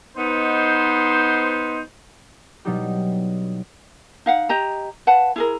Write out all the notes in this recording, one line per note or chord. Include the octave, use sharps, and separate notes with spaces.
B3 D#4 C5
B2 F#3 G3 D#4 E4 G4
D#4 F5 F#5
G4 D#5 A#5
B4 F5 F#5 A5
E4 G#4 A#4